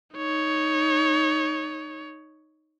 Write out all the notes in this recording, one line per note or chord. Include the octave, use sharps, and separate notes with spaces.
D#4 C#5